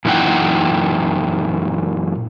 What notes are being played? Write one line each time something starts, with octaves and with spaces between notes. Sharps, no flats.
F#2 A#2 E3 D#4 F#5 G5